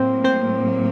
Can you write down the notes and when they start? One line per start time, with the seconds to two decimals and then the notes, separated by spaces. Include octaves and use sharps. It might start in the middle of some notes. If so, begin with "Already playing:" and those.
Already playing: A2 F#3 A#3 C4 C5
0.24 C4 C5